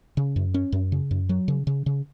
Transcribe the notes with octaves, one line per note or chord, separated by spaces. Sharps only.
C#3
F#2
C#4
F#2
C#3
F#2
F#3
C#3
C#3
C#3